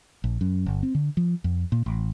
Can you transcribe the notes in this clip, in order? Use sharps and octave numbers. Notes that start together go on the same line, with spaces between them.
A#1
F#2
G1
C4
D3
F3
F2
A#2
A1